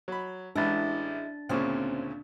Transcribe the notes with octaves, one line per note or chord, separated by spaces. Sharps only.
F#3 B5
A1 E3 G#3 D4 E4 A6
D2 A#2 C#3 C4 C#4